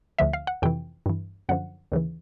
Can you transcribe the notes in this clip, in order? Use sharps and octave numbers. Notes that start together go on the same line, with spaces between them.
D2 D3 F3 E5
F5
F#5
F2 C3 E3 G5
G2 E3
F#2 D3 F3 F#5
D#2 C#3 E3